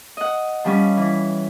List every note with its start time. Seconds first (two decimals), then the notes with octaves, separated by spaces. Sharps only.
0.17 D#5 F#5
0.65 F3 G3 C#4
0.97 E3